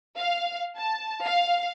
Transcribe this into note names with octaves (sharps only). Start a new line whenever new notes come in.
F5
A5
F5